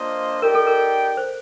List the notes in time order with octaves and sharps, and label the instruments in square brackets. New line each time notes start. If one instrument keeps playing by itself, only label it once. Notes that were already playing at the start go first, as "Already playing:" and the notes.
Already playing: [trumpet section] A#3 D4 F4 C5 D#5
[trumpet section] D#4 G4 D5 G5 [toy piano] A#4
[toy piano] A4
A#4
C5